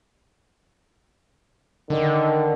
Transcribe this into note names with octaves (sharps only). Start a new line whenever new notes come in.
D3 D#3